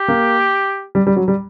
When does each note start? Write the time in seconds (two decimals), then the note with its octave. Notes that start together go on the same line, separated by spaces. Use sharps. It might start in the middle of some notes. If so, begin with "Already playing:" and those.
Already playing: G4
0.08 A#3
0.95 G3
1.07 G3
1.16 F#3
1.28 G3